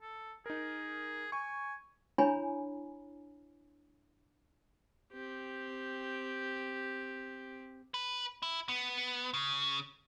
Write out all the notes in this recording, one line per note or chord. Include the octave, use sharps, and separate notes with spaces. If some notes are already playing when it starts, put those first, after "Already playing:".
A4
D#4 G#4 A#4
G#5 C#6
D4 E4 C#5 G#5 A#5 B5
C4 G4
B4
E4
B3
C#3